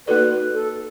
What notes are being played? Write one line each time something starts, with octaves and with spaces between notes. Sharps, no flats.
A#3 D#4 F#4 A4 B4 D5
A4